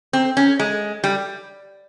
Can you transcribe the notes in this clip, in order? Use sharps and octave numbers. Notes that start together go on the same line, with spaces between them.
C4
C#4
G#3
G3